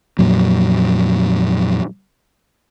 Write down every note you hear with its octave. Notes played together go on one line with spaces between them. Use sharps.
F2 A#2 F#3